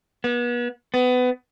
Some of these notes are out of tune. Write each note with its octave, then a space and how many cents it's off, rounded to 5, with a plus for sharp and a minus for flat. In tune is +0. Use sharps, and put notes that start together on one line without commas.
B3 -35
B3 +25